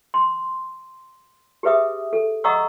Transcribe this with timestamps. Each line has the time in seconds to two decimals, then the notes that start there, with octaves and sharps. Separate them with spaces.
0.14 C6
1.63 G4 G#4 B4 E5 D#6
2.13 A4
2.44 D#5 F#5 A#5 C#6 D#6 E6